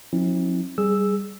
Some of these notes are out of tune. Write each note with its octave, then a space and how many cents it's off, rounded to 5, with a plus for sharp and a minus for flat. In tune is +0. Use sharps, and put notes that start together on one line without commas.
F3 +35 C4 +40 E4 -40
G3 -5 G#4 +0 E6 +0